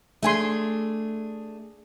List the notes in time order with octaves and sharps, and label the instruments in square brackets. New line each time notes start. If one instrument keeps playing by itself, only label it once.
[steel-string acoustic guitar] A3 D4 G#4 [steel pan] E5 G#5 C6